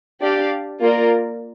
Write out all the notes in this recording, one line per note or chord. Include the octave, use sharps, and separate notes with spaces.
D4 G4 D5 F5
A#3 F4 A#4 D5